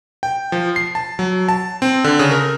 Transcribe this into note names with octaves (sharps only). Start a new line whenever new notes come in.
G5
F3
C7
A5
F#3
A5
C4
D3
C#3
A#4